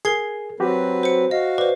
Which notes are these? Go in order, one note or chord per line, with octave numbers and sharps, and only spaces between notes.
G#4 A#4 G#6 C7
F#3 C4 F#4 G4 B4
C5 C#7
F#4 D#5 F5
B4 C5 D5